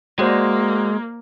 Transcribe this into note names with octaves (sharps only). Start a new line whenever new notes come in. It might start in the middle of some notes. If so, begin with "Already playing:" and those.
G#3 A#3 F#4 C5 D5